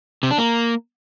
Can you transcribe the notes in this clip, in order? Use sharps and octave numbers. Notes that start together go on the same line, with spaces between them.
C3
D4
A#3